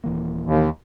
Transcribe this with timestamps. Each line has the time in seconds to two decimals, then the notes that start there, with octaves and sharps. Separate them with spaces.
0.04 D#1 E3 A#3
0.45 D#2